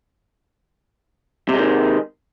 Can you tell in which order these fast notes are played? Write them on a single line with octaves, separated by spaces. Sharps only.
C3 G#3 D#3